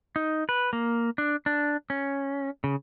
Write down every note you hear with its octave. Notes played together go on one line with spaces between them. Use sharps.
D#4
B4
A#3
D4
D4
C#4
C#3